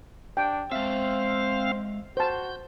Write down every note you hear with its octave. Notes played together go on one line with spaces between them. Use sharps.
D4 G5
G#3 C4 C5 E5 F5
F#4 C5 A5 G6